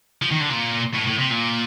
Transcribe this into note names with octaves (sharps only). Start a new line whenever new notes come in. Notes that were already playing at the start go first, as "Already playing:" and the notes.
F3
D#3
D3
A#2
A2
A2
C3
A#2